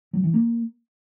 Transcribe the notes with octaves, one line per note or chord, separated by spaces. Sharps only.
F#3
E3
A#3